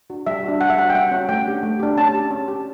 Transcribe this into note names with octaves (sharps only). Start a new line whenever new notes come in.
D4 F#4
G3 E5
F#4
D4
G3 F#5
E5
C#4 F#4 F#5
G5
G3 F#5
C#4 F#4
A3 G5
D4 G4
A3
D4 G4
C#4 A5
G4
C#4
G4